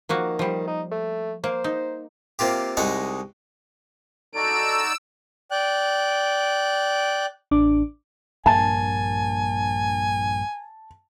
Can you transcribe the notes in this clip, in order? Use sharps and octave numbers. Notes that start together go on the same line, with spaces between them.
D#3 F3 A#3 F#4
F3 G3
D#4
A3
A#3 C5
D#4
C3 A#3 F4 G4
C2 G#3 D#4 F#5
D#4 F#4 A4 D5 E6 D7
D5 G5 F#6
A1 D4 D6
A#1 G2 A#3 G#5 A5